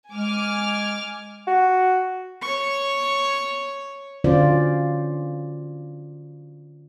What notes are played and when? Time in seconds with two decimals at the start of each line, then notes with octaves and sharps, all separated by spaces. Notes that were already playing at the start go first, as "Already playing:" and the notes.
0.12 G#3 G#5 D6 F6
1.48 F#4
2.42 C#5 C#6
4.24 D3 F#3 C#4 F4 C5 D5